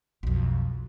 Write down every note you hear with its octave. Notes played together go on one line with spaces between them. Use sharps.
B1 F2